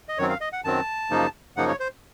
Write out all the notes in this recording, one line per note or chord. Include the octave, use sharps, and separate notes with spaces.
D#5
F#2 D#3 F#3 C4 C#5
F5
D#5
F#5
F#2 D#3 F#3 C4 A5
F#2 C#3 F3 A#3 D#4
F#2 C#3 F3 A#3 D#4 F#5
C#5
C5